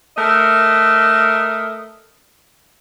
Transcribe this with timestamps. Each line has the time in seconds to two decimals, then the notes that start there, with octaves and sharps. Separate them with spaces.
0.15 A3 A#4 D#5